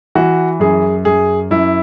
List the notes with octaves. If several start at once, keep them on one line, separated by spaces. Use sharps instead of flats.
E3 F#4
F#2 G#4
F#2 G#4
F#2 E4